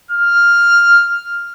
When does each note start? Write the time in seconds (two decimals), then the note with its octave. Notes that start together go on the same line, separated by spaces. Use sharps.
0.11 F6